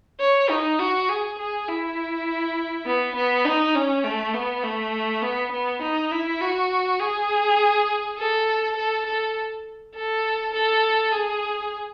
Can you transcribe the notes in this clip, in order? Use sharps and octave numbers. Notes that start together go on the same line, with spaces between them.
C#5
D#4
F#4
G#4
G#4
E4
B3
B3
D#4
C#4
A3
B3
A3
B3
B3
D#4
E4
F#4
G#4
A4
A4
A4
A4
A4
G#4